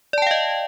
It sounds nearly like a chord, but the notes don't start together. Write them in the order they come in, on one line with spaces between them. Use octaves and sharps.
D5 A5 G5 F5 D#5